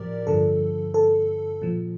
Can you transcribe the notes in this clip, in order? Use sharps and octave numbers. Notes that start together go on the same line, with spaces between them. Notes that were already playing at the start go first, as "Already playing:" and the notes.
Already playing: A2 F3 G4 A#4 D5
G2 D3 F3 A4
A4
A#2 F3